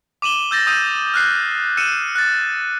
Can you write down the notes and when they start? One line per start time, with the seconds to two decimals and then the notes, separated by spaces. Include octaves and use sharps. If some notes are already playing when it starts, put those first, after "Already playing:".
0.22 D6 D#7 E7 F#7 G7
0.51 E6 G6 A6 A#6
0.67 D#6 E6 G6 D#7
1.14 F6 F#6 C7
1.77 E6 C#7 D#7 E7
2.15 F#6 A6